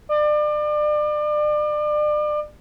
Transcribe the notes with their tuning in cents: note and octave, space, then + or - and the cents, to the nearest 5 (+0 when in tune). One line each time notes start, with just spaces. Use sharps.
D5 +35